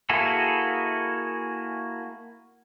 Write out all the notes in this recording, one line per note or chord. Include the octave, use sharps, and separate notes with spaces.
A#3 E4 F#4 G#4 A4